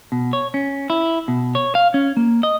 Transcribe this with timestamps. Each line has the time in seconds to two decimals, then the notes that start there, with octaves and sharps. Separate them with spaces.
0.12 B2
0.33 C#5
0.54 C#4
0.90 E4
1.28 B2
1.55 C#5
1.75 F5
1.94 C#4
2.17 A#3
2.43 D#5